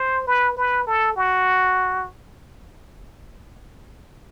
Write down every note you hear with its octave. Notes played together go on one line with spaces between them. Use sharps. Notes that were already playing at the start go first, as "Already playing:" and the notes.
Already playing: C5
B4
B4
A4
F#4